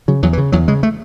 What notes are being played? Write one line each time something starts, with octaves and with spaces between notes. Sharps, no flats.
C#3 F#3
E2 F#3
E3
C#3
E2 F#3
C#3 G#3
A3